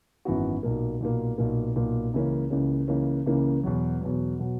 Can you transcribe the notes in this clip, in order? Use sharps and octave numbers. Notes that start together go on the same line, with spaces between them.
G#1 F#2 E3 B3 F#4
B1 A#2 A#3
B1 A#2 A#3
B1 A#2 A#3
B1 A#2 A#3
C#2 C#3 E3 A#3 C#4
C#2 C#3 E3 A#3 C#4
C#2 C#3 E3 A#3 C#4
C#2 C#3 E3 A#3 C#4
E2 B2 F#3
E2 B2 F#3
B2 F#3